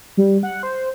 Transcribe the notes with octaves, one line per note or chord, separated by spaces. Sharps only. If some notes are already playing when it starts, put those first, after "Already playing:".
G3
F#5
C5